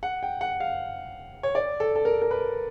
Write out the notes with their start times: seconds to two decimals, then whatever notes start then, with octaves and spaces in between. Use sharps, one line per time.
0.03 F#5
0.23 G5
0.41 F#5
0.60 F5
1.43 C#5
1.55 D5
1.80 A4
1.96 A4
2.05 A#4
2.22 A#4
2.31 B4